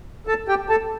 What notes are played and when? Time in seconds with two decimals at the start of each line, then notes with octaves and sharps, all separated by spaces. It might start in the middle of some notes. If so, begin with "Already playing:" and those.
0.27 A4 A5
0.48 G4 G5
0.69 A4 A5